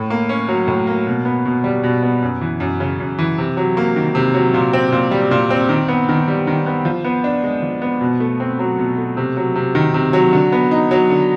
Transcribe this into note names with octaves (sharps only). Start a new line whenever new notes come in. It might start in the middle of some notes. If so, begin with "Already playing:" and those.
Already playing: A2
A#3
C#4
F#3
A2
A#3
B2
B3
B2
G3
B2
B3
F#2
E3
F#2
C#3
F#2
E3
C3
F#3
A#3
D#3
C3
F#3
A#2
C4
A#2
G3
A#2
C4
D#3
B3
D#3
G3
D#3
B3
F3
B3
D4
G#3
F3
B3
B2
A3
C4
F#3
B2
A3
C3
F#3
C3
D#3
C3
F#3
D3
B3
D#4
F#3
D3